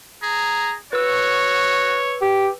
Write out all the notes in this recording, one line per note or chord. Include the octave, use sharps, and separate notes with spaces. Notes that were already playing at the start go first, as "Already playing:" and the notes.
G#4 A#5
F#4 B4 C#5 E6
G4